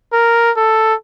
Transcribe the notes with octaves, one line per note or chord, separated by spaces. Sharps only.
A#4
A4